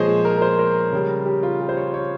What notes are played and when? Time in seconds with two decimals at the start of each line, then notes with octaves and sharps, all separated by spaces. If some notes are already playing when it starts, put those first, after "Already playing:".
Already playing: A#2 F3 G#3 G#4 C5 C#5 D#5
0.25 A#4
0.37 A#4
0.42 C5
0.59 A#4
0.93 C#3 G3
1.26 G4
1.43 F4
1.60 G4
1.69 C5
1.77 C#5
1.94 C#5